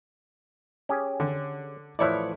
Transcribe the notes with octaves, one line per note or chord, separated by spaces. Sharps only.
C#4 G4 G#4
D3
A2 E3 F3 E4 C#5 D5